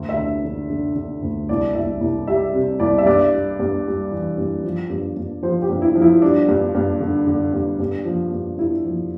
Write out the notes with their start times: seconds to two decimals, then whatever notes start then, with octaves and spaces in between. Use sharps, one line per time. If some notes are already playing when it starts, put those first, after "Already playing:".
Already playing: D2
0.09 E5
0.18 D3
0.44 D3
0.70 D3
0.96 D3
1.22 D2
1.49 C2 D5
1.75 C2 E5
2.01 C2
2.27 G3 E5
2.54 C3
2.80 C2 D5
2.98 E5
3.06 G2 D5
3.32 G3
3.60 G2
3.86 G3
4.11 E3
4.38 G2
4.64 F3
4.90 G2
5.17 G2
5.43 F3 C5
5.62 G4
5.69 G2
5.82 E4
5.95 F3
6.02 E4
6.22 G3 D4
6.49 G2
6.75 G2
7.00 D3
7.27 D3
7.54 G2
7.80 G2
8.05 F3
8.32 G2
8.58 G2 E4
8.84 F3